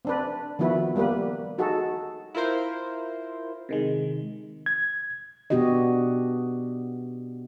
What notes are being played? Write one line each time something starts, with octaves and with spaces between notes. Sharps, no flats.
C4 D4 B4
D#3 F3 B3 E4 F#4 B4
G3 A#3 B3 B4
D#4 F#4 G#4 A4
E4 F4 A#4 C5
C3 D#3 G#3
G#6
B2 B3 D4 F#4 G4 D#5